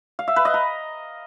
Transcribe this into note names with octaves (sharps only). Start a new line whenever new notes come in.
F5
E5
B4
D#5
A#5